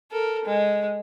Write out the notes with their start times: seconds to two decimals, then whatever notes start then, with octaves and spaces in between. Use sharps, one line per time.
0.12 A4 A#4
0.45 G#3